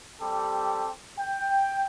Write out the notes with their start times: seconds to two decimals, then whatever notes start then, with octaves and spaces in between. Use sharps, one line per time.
0.20 G3 C4 G4 A4
1.18 G5